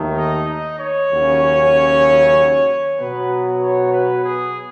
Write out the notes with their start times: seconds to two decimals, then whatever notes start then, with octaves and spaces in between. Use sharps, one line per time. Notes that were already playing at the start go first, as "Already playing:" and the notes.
Already playing: D#2 D#3 A3
0.17 D#4
0.48 D#4
0.80 C#5
1.11 D#2 C#3 F#3 C#4
2.99 B2 F#3 B3 B4
3.62 C#5
3.92 B4
4.24 G#4